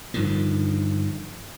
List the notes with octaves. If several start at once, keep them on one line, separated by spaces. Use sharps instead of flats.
G2 D3 D#3 F3